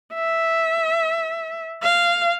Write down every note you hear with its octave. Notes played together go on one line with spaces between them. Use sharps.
E5
F5